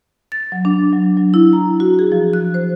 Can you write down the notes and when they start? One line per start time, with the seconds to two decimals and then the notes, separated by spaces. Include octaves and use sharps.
0.32 A6
0.52 F#3
0.65 D4
0.93 F#3
1.17 F#3
1.34 E4
1.53 A#5
1.80 F#4
1.99 G#4
2.12 F3
2.33 F#6
2.54 C5